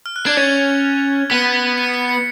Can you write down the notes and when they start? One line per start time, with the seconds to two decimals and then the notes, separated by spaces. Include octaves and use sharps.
0.06 F6
0.16 F#6
0.26 D4 G#6
0.37 C#4 A6
1.30 B3 B6
1.78 C#7
1.94 C#7
2.09 C#7